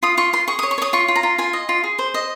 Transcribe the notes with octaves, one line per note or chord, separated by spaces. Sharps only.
F4 D#6
F4 C#6
F4 C6
G#4 C#6
D#6
C#5
C#6
C#5 D#6
F4 C#6
F4
A#5
F4
F4 G#5
D#5
F4
G#4
C5
D#5